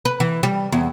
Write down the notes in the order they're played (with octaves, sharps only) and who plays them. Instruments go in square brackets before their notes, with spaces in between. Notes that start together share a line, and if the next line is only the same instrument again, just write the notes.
[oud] B4
E3
G3
E2